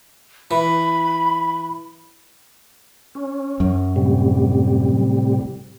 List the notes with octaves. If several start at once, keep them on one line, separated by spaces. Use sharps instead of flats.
E3 B5
C#4
F#2
A2 C3 G3